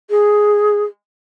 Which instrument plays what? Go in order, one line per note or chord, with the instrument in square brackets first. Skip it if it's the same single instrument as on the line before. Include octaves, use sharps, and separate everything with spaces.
[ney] G#4